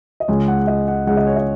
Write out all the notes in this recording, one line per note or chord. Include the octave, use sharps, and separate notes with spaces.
D#5
C#2 C#3 G#3 C#5
F#5
D#5
F#5
C#2 C#3 G#3 F#5
D#5
C#5
D#5